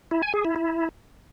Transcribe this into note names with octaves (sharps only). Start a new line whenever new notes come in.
E4
G#5
G#4
E4
E4